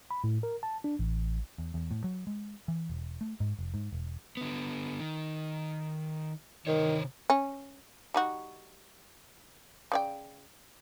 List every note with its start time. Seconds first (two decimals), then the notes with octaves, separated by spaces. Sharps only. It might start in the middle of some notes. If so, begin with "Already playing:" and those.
0.11 B5
0.24 A2
0.43 A#4
0.63 A5
0.84 D4
0.99 A1
1.58 E2
1.74 E2
1.91 A2
2.04 F#3
2.27 G#3
2.68 E3
2.90 E1
3.21 A3
3.40 G#2
3.59 F1
3.74 G#2
3.92 E1
4.37 D3 B3
5.00 D#3
6.67 C3 D#3 C5 C#5
7.30 C#4
8.14 G3 D#4 F#4
9.92 C#3 D5 G5